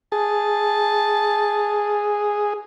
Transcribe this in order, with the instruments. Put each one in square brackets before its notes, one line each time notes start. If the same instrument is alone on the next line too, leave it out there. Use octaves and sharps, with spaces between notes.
[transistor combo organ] G#4 [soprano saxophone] A5